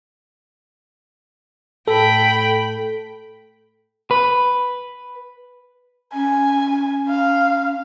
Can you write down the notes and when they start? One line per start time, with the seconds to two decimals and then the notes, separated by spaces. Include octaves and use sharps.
1.87 A2 A4 G5 B5
4.11 B4
6.13 C#4 G#5
7.09 F5